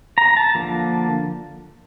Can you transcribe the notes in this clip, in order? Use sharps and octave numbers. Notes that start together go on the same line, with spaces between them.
A#5
A5
D3 F3 A#3